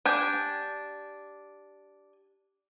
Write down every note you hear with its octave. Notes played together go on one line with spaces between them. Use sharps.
D4 G4 G#5